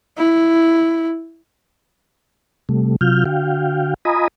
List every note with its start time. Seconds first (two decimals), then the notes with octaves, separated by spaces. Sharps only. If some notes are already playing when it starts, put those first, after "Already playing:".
0.17 E4
2.69 C3 G3 A3
3.01 C3 F#3 F4 F6 G6
3.26 D3 F#4 F5 G5
4.05 F4 D#5 G#5 A#5 B5 D#6